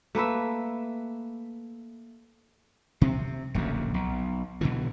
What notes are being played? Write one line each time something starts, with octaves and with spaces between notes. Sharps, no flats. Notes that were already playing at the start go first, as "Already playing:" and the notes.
A3 A#3 B4 E5
C3 C4
D1 A#1 F#2 C#3
B1
B2 D3 E3